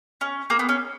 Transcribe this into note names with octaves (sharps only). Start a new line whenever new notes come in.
C#4
A#3
B3
C#4